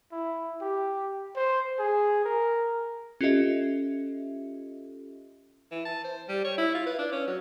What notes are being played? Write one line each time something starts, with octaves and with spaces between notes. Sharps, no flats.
E4
G4
C5
G#4
A#4
C#4 F4 G4 A4 D#5 E5
E3
A5
C5
G3
C#5
E4
F4
B4
D4
C#4
F#3